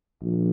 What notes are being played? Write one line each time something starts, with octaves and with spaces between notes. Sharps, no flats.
A#1